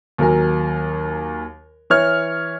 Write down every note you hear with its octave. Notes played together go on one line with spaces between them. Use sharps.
D#2 F#3 A#4 G#5
E3 C#5 F6